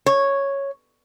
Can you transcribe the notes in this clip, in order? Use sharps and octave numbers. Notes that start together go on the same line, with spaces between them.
C#5